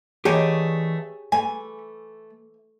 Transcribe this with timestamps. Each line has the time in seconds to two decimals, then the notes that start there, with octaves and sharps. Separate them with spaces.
0.25 D3 E3 A3 A#3 G4 G#4 C#5 D#5
1.32 E3 A3 G#5